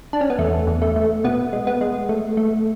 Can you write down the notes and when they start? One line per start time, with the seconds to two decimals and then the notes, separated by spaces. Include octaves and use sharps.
0.13 D4
0.21 C#4
0.30 B3
0.39 E2 A3
0.67 E2
0.82 A3
0.96 A3
1.24 B2 B3
1.53 G#3
1.67 B3
1.81 G#3
2.09 A3
2.37 A3